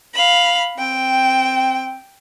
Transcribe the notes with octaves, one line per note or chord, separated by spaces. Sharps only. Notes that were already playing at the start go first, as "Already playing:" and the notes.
F5 B5
C4 G5